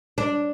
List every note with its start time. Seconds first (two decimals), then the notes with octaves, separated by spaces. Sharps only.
0.18 D4